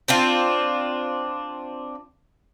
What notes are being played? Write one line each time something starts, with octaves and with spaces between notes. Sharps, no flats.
C4 D4 F4